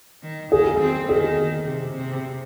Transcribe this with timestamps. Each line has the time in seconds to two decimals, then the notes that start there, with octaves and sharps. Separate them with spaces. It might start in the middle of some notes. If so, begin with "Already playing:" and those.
0.23 D#3
0.52 D#3 G#4
0.80 C4
1.09 D#3 G#4
1.66 C3
1.95 C3